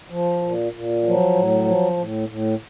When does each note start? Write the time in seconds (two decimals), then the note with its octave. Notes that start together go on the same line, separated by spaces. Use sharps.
0.10 F3
0.42 A#2
0.72 A#2
1.04 F3 F#3
1.35 A2
1.65 F3
1.97 A2
2.28 A2